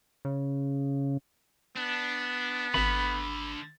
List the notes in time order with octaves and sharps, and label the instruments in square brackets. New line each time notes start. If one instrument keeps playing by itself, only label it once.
[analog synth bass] C#3
[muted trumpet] B3 [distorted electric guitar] D4
[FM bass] G#1 [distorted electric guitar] D3 A3 [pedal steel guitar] B5